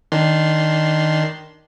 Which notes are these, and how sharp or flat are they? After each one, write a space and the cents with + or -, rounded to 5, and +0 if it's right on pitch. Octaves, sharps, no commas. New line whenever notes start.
D#3 +0 D4 -10 C6 +0